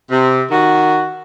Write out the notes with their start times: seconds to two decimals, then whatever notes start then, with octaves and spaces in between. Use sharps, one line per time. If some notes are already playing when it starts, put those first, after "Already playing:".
0.11 C3
0.51 D#3 F#4